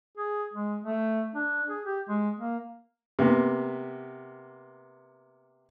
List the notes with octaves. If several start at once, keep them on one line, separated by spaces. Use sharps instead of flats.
G#4
G#3
A3
D4
G#4
G4
G#3
A#3
C3 A#3 B3